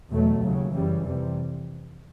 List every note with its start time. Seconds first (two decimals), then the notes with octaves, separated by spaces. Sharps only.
0.11 E2 B2 F#3 A3
0.43 D#2 C#3 F#3
0.74 F#2 C#3 E3 G3
1.06 F2 C3 E3 G3